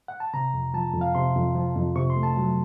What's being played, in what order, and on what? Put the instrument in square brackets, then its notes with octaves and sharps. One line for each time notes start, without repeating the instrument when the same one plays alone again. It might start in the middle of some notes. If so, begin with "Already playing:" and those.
[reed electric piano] F#5
A5
C3 A#5
F2
F3 A5
F2
F5
C3 C6
F2
F3
F2
C3 C#6
C6
A3
A5
F#3